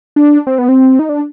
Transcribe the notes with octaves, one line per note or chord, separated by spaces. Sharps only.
D4
C4
B3
C4
D#4
D4